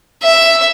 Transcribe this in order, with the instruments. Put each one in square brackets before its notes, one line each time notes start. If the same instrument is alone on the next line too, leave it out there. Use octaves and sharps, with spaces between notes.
[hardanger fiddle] E5